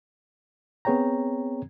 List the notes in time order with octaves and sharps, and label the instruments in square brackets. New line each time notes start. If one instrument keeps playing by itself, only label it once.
[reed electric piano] B3 C4 G#4 C#5 G5 A#5